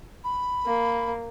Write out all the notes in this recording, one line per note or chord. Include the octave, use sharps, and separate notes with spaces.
B5
A#3